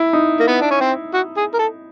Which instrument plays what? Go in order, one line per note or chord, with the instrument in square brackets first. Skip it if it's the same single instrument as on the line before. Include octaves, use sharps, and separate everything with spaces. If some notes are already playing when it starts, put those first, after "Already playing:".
Already playing: [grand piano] E4
D#4
[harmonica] A#3
B3
D4
C#4
C4
F#4
G#4
A#4
A4